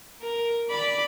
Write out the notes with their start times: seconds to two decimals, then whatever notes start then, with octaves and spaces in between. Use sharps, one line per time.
0.22 A#4
0.69 D5 B5